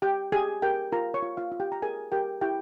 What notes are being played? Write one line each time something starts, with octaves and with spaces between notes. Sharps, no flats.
G4 G5
G4 G#4 G#5
G4 A#4 G5
F4 A#4 A#5
C#5 C#6
F4
F4 F5
F4
G4 G5
A#5
G#4 A#4 G#5
G4 A#4 G5
E4 G4 G5